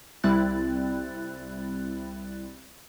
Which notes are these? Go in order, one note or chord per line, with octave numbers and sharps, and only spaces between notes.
C2 G3 C4 E4 F#6 A6